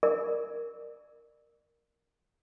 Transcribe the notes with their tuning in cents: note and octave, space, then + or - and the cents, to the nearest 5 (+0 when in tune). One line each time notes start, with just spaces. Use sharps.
A#4 +0 D5 +25